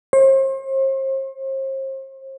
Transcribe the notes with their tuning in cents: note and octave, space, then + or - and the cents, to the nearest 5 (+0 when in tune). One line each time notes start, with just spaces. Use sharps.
C5 +40